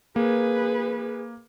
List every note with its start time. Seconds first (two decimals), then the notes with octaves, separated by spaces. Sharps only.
0.16 A#3 G#4 B4